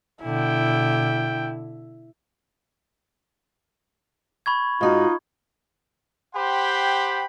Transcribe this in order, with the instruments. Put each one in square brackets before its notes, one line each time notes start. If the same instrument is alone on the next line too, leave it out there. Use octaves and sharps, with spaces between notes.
[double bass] B2 D3 [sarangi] E4 [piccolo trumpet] G5
[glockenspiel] B5 C#6 G#6
[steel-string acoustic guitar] G#2 F#4 [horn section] D#4 [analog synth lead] F4
[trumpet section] G4 C5 F#5 G5 B5 C6